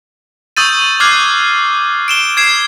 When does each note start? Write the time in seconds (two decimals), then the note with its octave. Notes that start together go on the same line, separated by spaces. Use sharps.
0.57 C#6 D#6 E6 G6 A6 D#7
1.00 D6 F6 F#6 G#6 C7
2.08 D7 E7 G7
2.37 G#6 C7 E7